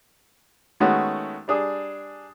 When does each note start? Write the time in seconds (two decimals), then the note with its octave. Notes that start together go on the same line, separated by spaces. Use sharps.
0.80 D#3 G#3 A3 B3 C#4 F#4
1.48 G3 D4 G#4